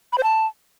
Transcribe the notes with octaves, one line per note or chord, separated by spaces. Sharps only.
B5
C5
A5